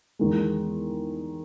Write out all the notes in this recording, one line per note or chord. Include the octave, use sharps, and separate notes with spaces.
E2 D#3 G#3